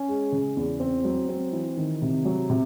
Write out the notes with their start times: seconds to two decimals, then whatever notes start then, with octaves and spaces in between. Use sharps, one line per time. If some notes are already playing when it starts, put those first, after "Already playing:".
Already playing: C#4
0.08 G#3
0.32 C#3
0.57 E2
0.80 C4
1.05 F#3
1.29 C4
1.52 E3
1.77 D#3
2.02 C3
2.25 F#3
2.50 C3